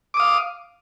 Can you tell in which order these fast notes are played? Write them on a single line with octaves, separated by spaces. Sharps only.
D6 D#6 F5